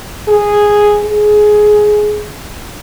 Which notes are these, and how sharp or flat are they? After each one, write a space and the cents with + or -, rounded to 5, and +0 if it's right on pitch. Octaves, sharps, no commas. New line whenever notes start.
G#4 -5
G#4 +15